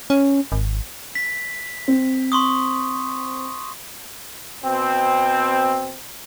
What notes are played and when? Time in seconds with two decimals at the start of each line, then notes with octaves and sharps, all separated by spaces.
0.10 C#4
0.52 G#1
1.15 B6
1.88 C4
2.32 C6 C#6 D#6
4.64 B2 C4